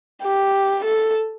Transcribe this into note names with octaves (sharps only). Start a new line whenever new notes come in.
G4
A4